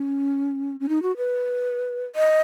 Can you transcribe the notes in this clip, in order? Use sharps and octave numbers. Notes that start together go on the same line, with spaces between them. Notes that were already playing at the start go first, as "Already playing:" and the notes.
Already playing: C#4
C#4
D#4
F#4
B4
D#5